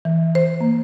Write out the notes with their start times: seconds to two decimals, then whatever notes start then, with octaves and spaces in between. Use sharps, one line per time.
0.05 E3
0.35 C5
0.61 A#3